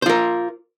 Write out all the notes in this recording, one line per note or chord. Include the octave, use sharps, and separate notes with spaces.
F4 A#4 C5